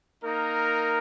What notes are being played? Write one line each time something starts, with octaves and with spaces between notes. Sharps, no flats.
A#3 D#4 A#4